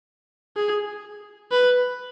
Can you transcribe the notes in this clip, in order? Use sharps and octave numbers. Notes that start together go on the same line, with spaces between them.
G#4
B4